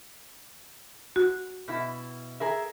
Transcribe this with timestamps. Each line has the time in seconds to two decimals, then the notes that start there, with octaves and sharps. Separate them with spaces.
1.16 F#4
1.68 B2 E4
2.40 G#4 A#4 E5